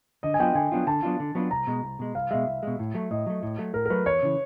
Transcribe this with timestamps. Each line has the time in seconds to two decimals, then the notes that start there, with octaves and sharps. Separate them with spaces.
0.23 D3 D#5
0.34 G#5
0.39 F#3 B3 D4 F4 G5
0.55 D3 G#5
0.72 F#3 B3 D4 F4
0.87 D3 A5
1.03 F#3 B3 D4 F4
1.20 D3
1.35 F#3 B3 D4 F4
1.51 C2 A#5
1.67 B2 G#3
1.83 C2
1.99 B2 G#3
2.15 C2 F5
2.31 B2 G#3 E5
2.47 C2
2.63 B2 G#3
2.79 A2
2.94 F#3 A3
3.11 A2 D#5
3.26 F#3 A3
3.43 A2
3.58 F#3 A3
3.74 A2 A#4
3.86 A#4
3.90 F#3 A3 B4
4.06 E2 C#5
4.23 C#3 E3